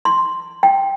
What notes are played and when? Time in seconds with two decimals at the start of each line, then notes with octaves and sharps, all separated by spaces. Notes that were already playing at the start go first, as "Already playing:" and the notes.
0.05 C6
0.63 G5